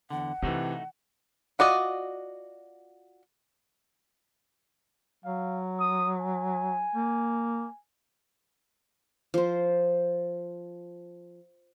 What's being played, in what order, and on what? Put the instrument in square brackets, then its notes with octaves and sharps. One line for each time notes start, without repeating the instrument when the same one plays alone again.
[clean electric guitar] E2 D3 [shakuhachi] F#5
[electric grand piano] C3 E3 [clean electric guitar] A3 D#4 F#4 [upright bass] D4
[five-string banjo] F4 F#4 D5 D#5
[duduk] F#3 [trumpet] F5
[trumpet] D#6
G#5
[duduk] A#3
[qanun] F3 C5